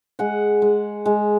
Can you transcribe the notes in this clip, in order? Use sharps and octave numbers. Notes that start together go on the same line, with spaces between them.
G#3 F#5
G#3
G#3